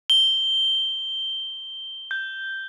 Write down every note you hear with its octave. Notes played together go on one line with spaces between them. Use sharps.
G7
G6